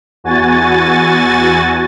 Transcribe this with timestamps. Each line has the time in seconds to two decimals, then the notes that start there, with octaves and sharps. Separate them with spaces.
0.24 E2 F#4 G#5 A6